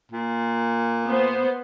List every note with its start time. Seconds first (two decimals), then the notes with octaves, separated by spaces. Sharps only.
0.11 A#2
1.07 B3 C5